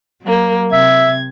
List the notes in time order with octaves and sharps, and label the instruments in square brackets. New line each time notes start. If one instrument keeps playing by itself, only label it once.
[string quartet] F#3 A#3
[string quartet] C3 G#6 [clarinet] E5